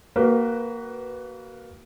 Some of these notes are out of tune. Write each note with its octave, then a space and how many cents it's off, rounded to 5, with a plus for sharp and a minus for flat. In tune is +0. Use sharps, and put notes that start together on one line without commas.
A#3 +0 F#4 +30 B4 +0